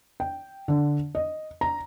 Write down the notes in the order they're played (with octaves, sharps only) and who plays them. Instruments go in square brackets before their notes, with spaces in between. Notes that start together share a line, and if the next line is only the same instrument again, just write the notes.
[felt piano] G5
D3
D#5
A#5